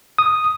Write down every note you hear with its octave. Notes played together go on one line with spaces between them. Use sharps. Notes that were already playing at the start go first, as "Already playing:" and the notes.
D#6